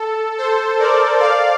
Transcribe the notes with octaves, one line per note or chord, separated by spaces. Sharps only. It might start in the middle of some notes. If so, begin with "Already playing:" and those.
Already playing: A4
A4 C5
A#4 D5
D5 F5